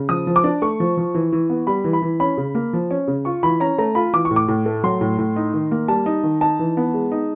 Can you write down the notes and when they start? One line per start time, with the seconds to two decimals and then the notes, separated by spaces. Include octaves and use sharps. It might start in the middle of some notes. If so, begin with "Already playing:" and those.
Already playing: C#3
0.09 F3 D#6
0.27 F3
0.36 D6
0.44 D4
0.62 A3 C#6
0.80 F3
0.97 F3
1.15 E3
1.33 E3
1.50 B3
1.67 G3 B5
1.84 E3
1.93 B5
2.02 E3
2.20 C#4 B5
2.37 C#3
2.55 A#3
2.73 F3
2.91 C#4
3.08 C#3
3.25 F4 C#6
3.43 E3 B5
3.60 C#4 A#5
3.78 A3 A#5
3.95 F4 B5
4.13 E3 D6
4.25 C#6
4.31 A2
4.36 D6
4.48 A2
4.66 A3
4.84 F#3 C6
5.01 A2
5.19 A2
5.36 D#4
5.54 D#3
5.71 A#3
5.88 G3 A5
6.06 D#4
6.23 D#3
6.41 D#4 A5
6.59 E3
6.77 B3
6.94 G#3
7.12 D#4